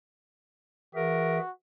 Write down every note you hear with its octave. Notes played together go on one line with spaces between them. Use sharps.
E3 F#4 G#4 A#4 E5